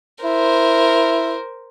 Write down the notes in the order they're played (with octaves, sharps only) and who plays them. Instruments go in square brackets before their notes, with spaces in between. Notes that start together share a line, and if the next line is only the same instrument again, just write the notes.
[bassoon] E4 [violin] A#4 C5